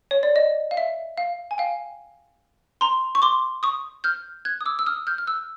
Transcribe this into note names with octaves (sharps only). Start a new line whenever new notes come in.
C#5
D5
D#5
F5
E5
F5
G#5
F5 G5
A#5 C6
C#6
C6 D6
C#6 D#6
F6 G6
F#6 G#6
D#6
D6 E6
E6
D#6 F6
F6 G6
F6
E6 F#6